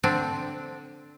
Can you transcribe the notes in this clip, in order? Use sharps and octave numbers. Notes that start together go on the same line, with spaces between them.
D3 C4 D4